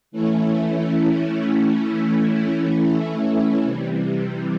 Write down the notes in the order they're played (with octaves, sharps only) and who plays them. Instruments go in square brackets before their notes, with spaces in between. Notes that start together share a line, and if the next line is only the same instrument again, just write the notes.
[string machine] E3 A3 C#4 E4
C3 E3 G3